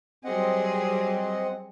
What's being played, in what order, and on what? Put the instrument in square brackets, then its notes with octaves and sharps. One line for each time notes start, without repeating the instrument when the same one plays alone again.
[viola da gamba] F#3 G3 G#4 [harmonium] C4 D#5 F#5